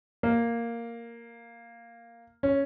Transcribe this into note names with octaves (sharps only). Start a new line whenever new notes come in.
A#3
C#4